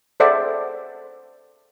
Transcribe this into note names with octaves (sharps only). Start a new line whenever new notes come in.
G#4 A4 C5 D5 E5 F#5